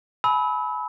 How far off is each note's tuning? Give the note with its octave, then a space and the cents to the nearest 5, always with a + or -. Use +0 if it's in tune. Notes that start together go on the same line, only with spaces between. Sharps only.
G#5 +40 B5 +0 E6 -35